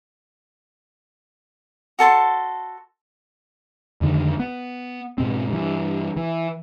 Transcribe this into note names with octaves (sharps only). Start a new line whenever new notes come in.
F#4 A4 A5 C6
F2 D3 D#3
B3
G#2 B2 C4
G2 E3
E3